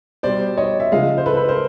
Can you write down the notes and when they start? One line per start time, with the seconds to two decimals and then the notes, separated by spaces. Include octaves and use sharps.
0.23 B2 G3 C5 D5
0.57 C#5 D#5
0.80 E5
0.92 C#3 F3 G#3 D#5 F5
1.17 C5
1.26 A4 B4
1.37 A4 B4
1.48 A#4 C5